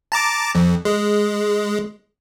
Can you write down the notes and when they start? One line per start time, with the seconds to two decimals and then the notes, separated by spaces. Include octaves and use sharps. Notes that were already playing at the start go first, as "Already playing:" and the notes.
0.12 A5 A#5 D6
0.55 F2
0.85 G#3